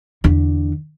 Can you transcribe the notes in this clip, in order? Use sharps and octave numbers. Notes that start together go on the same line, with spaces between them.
E2 D3